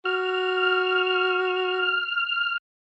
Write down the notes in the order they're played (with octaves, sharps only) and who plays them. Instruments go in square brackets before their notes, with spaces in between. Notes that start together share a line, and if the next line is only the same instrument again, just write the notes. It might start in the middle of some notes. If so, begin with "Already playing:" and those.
[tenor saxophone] F#4 [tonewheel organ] F6